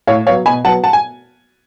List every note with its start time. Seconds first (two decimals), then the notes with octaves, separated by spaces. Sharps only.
0.07 A2 C#5 F5
0.27 F#3 B3 C#5 F5
0.46 B2 G#5 B5
0.65 F#3 B3 F#5 A5
0.84 F#5 A5
0.93 G#5